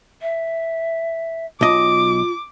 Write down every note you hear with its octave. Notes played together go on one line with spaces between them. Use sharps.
E5
B1 F4 D#5 D6